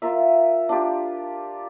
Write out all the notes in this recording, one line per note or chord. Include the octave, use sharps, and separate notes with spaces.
F4 A#4 E5
D4 F4 G4